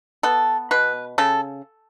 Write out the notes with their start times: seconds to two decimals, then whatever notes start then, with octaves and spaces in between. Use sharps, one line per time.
0.23 B3 A4
0.71 B2 B4
1.18 C#3 A4